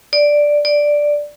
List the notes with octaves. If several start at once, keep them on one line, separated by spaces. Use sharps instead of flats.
D5
D5